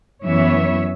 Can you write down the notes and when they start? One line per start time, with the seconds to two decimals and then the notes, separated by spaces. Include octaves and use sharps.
0.24 F#2 E3 B3 C#5 E5